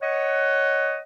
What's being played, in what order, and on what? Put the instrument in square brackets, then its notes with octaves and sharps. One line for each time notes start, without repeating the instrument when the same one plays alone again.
[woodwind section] C#5 D#5 F#5